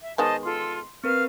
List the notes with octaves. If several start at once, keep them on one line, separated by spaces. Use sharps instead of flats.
E5
D#3 G#3 B3 C5 D#5 A5
F4 A4 C6
C4 A#4 B4 F5 F6